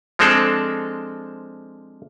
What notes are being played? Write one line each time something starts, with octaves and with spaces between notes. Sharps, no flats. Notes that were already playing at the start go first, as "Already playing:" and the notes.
F3 G#3 C4 D4 A4